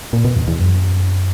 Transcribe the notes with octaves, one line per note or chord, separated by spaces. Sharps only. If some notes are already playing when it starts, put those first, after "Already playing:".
A#2
B2
E2
E2
F#2